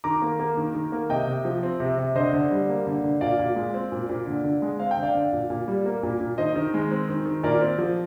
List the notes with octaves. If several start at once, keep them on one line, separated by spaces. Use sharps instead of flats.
D#3 A#5 D6
A#3
A#3
D#3
D#3
A#3
C3 D#5 G5
C3
F3
C4
C3
C3
D3 C5 D#5
D3
G3
A#3
D3
D3
A#2 D5 F5
A#2
G#3
C4
A#2
A#2
D3
D3
G#3
C4 F5
G5
D3
D5 F5
D3
A#2
A#2
G3
A#3
A#2
A#2
D#3 C5 D#5
D#3
G#3
C4
D#3
D#3
A#2 A#4 D5
C4
F3